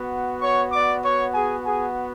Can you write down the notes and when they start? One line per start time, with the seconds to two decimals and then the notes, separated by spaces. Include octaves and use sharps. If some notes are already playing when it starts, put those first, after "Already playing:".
Already playing: B3 F#4
0.41 C#5 C#6
0.72 D5 D6
1.03 C#5 C#6
1.34 G#4 G#5
1.65 G#4 G#5